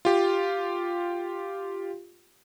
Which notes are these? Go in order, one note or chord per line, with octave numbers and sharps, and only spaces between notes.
F4 G4